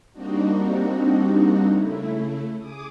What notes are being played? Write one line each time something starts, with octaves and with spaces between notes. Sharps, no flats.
G3 A#3 C4 D4 D#4 F#4
C#3 A3 E4
G#4 D6 D#6